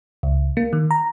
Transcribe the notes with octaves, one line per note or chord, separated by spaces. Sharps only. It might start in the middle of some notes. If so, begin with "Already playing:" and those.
C#2
A#3
D#3
A#5